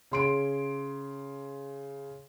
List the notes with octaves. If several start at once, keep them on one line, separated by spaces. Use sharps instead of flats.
C#3 C6 D7